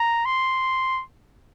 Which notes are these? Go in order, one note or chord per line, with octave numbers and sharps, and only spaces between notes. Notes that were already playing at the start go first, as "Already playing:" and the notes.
Already playing: A#5
C6